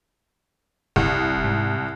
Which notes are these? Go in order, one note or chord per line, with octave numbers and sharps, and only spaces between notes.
F1 C2
G#2